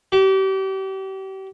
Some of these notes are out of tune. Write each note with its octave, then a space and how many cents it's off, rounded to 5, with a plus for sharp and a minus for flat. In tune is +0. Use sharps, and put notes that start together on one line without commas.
G4 -35